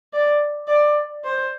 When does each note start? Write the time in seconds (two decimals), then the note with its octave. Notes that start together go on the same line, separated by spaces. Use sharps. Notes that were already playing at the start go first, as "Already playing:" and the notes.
0.13 D5
0.68 D5
1.24 C5